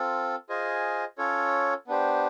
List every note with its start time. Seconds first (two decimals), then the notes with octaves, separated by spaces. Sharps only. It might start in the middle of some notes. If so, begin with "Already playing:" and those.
Already playing: C4 F4 A4
0.49 F4 G#4 C5 D#5 G#5
1.18 C#4 F4 A4 C#5
1.87 B3 D4 G4 C5